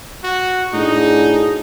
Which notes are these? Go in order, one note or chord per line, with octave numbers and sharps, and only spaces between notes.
F#4
A2 D4 D#4 F#4 G#4